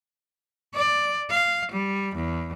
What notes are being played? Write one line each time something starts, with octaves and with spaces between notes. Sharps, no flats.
D5
F5
G3
E2